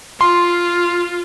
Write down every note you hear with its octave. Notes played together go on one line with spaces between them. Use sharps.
F4 C6